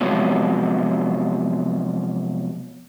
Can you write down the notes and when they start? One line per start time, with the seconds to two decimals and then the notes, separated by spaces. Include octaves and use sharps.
0.01 C3 F3 F#3 G#3 B3 C#4